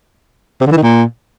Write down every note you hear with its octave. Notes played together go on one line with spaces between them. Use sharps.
C3
D3
E3
D#3
A#2